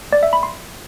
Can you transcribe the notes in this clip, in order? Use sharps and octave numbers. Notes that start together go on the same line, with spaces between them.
D5
E5
B5
C6